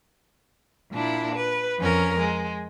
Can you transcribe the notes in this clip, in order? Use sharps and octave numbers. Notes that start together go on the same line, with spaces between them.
A#2 D4 E4
B4
F2 C#4 A#4
G#3